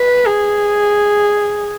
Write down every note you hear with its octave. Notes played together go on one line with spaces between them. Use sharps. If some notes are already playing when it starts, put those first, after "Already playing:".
Already playing: B4
G#4